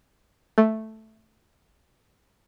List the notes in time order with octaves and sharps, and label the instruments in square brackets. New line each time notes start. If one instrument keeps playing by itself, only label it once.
[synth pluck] A3